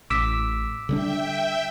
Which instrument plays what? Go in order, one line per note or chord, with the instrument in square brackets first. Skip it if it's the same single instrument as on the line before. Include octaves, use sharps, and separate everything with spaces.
[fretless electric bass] A1 [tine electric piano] D6 E6 B6
[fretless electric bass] D3 G3 D4 [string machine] E5 G5